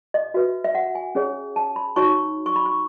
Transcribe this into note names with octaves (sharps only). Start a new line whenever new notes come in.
D#5
F#4 B4 E5
E5
F#5
G#5
C#4 G#4 C#5
A5
B5
D#4 F#4 C#5 C#6
C#6
B5
C#6